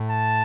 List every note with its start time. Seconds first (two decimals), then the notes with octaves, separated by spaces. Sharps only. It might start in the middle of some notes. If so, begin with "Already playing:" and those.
Already playing: A2
0.10 A5